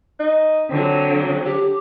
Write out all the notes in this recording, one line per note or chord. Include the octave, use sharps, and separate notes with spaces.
D#4
D3 F#3 C4
G4